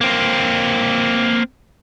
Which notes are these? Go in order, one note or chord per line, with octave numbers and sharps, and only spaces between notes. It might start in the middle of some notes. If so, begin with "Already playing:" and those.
A#3 C4